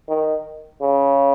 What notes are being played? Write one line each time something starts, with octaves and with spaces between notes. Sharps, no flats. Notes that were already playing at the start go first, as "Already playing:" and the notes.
D#3
C#3